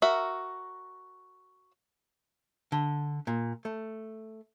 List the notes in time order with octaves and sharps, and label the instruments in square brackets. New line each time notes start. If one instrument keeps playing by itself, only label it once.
[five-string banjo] F#4 A#4 E5
[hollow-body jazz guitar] D3
A#2
A3